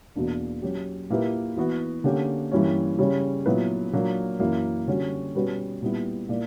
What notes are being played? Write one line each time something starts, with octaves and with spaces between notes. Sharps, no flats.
E2 B2 A#3 D4
F#3 C#4 G4
A#2 A#3 E4 G4 B4
E3 B3 F#4
D3 A#3 C#4 G4
G2 E3 G3 A#3 C#4
C#3 G3 C#4
A#2 F#3 B3 E4 B4
A#2 F#3 A#3 D4 A#4
F#2 E3 A#3
D3 G3 C#4 F#4
B2 G3 C#4 F#4 B4
A#2 G3 B3 E4
A#2 A#3 E4 A#4 D5